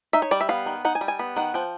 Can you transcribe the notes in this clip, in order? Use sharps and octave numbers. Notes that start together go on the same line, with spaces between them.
D#4 E5
C#5
G3 D5
E5
B3 F5
D#3
D#4 F#5
G#5
G3
G#5
B3
D#3 F#5
F3 G5